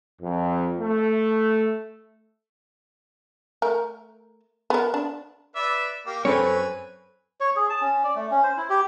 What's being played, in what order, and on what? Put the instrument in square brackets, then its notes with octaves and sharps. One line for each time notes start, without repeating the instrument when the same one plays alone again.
[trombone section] F2
A3
[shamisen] A3 A#4
B3 A#4
D4
[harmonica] B4 D5 E5
A#3 G4
[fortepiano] F#2 C4 [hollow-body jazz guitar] A4 C#5 [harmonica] B4 G#5
[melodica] C#5
G#4
A5
C#4
D5
A3
C#4
C5
E4
G4